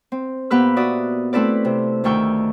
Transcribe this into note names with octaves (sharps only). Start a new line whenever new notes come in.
C4
A#2 B3 G4 B4 E6
F#4 D5 E5 D#6
A3 C4 E4 A4 B4 D5
C3
D2 D#3 A3 G5 C#6 E6